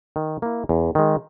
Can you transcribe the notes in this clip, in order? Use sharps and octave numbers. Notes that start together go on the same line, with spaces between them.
D#3
A#3 E4
E2
D#3 G#3